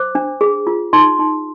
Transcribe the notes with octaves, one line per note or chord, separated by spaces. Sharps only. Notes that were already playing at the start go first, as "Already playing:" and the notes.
Already playing: C5 D6
D4
G#4
F4
D#4 C6
D#4